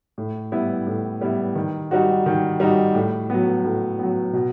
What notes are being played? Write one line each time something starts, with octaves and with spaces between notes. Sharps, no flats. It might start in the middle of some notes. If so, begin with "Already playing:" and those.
A2
G3 B3 E4
A2
G3 B3 E4
D#3
G3 D#4 F#4
D#3
G3 D#4 F#4
A2
F#3 B3
A2
F#3 B3
B2